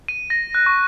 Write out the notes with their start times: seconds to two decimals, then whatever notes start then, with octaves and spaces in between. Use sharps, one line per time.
0.08 D#7
0.30 A#6
0.55 F#6
0.66 C#6